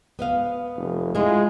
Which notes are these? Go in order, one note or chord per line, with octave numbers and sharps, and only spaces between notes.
B3 D#5 F5
F1
G#3 E4 F4